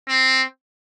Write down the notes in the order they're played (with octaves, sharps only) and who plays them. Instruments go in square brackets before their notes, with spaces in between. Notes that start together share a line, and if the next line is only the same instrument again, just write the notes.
[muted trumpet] C4